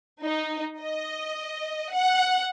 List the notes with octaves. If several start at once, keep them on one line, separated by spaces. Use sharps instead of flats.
D#4
D#5
F#5